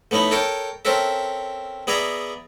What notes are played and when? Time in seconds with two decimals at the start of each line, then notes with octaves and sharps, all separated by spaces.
0.11 A3 B3 C#4 D#4 E4
0.31 A4 A#4 C#5 G5 A5
0.85 C4 C#4 A4 A#4 E5
1.87 B3 G#4 D5 E5 G#5 A#5